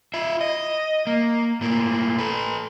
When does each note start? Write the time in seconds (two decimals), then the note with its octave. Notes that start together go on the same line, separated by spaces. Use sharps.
0.14 F4 E5
0.41 D#5
1.07 A#3
1.61 A2 A#3
2.19 A4 B4